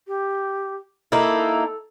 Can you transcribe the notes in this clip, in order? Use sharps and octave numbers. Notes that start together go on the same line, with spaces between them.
G4
A#3 D#4 E4 A4